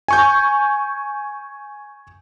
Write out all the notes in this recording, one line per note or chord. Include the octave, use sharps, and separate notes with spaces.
G#5 C#6 G6